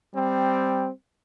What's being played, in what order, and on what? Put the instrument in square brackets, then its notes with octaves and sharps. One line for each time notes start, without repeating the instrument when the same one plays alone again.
[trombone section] G3 C4